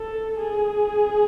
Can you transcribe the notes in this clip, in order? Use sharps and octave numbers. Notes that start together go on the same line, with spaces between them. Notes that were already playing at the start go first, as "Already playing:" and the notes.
Already playing: A4
G#4